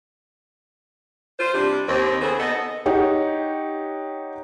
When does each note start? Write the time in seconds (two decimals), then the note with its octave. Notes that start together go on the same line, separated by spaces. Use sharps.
1.39 F4 C5
1.54 C3 G3 D4
1.88 D#2 C4
2.21 C#3 B3 G#4 A4 C5
2.40 B3 D#4 A4 D#5
2.86 D#4 G4 C#5 F#5